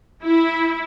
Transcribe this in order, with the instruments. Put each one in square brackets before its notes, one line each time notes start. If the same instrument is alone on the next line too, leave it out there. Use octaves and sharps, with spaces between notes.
[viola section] E4